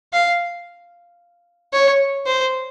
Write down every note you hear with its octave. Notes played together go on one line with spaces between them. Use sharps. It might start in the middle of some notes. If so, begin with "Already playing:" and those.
F5
C#5
C5